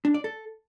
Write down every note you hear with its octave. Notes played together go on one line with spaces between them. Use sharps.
D4
D5
A4